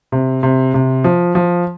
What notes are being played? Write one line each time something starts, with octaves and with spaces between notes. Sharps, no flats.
C3
C3
C3
F3
F3